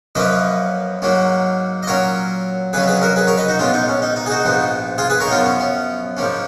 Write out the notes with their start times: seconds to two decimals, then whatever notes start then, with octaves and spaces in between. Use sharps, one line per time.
0.15 F#2 F3 A#3 C#4 B4 D#5
1.02 G#2 F#3 A#3 C#4
1.83 D#5
1.87 A#2 F#3 C#4 A#4 C#5
2.73 F2 C#3 F#3 C#4 G#4 B4
2.88 G#4 B4
3.01 F#4 A#4
3.16 G#4 B4
3.27 A#4 C#5
3.37 B4 D#5
3.48 D#4 F#4
3.59 A#1 A#2 G#3 B3 C#4 F4
3.74 D#4
3.88 C#4
4.02 D#4
4.16 D#4
4.26 G#4
4.30 D#4 F#4
4.45 A#1 G#2 F3 B3
4.98 F4 G#4
5.10 G#4 B4
5.20 A#4 C#5
5.27 D#4
5.31 F#2 F3 B3 C#4 F4
5.45 C#4
5.60 C#4
6.17 G#2 F3 A#3 C#4